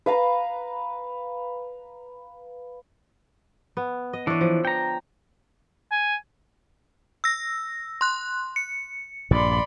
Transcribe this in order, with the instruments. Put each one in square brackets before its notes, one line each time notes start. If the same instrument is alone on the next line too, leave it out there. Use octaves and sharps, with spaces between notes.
[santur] B4 F5 A#5 B5
[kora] B3
D#5
[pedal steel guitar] E3 [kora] D4 C#5
[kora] F3
[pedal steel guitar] G5 A#5
[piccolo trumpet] G#5
[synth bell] E6 A#6
C6 F#6
C#7
[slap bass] A#1 G2 A#2 [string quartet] D5 B5 C6